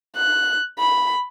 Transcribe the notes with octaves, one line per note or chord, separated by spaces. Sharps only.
F#6
B5